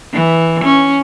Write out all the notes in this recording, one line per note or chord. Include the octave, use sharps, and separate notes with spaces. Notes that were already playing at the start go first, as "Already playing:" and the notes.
E3
C#4